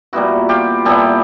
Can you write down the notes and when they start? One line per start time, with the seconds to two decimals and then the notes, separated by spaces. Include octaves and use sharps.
0.13 A#2 G3 B3 E4 F#4
0.49 F4 G4
0.85 A#2 G3 B3 E4 G4 A4